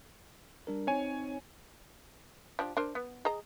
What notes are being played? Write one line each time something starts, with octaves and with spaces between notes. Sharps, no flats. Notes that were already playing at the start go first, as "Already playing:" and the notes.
G3 D4 A#4
C4 D#4 C#5 G#5
F3 D4 G4
D4 A#4 C5
B3
G#4 D#5 A#5